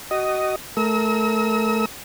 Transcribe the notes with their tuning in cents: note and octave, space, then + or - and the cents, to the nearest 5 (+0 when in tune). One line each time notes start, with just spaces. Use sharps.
F#4 +30 D#5 +0
A3 -15 A#4 +0 E6 -40